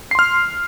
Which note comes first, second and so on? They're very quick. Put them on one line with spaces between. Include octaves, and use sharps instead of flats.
C7 C6 F6